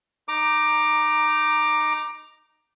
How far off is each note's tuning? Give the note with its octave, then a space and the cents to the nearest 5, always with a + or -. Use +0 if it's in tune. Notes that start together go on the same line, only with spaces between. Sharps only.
D#4 -10 A#5 +0 D6 +15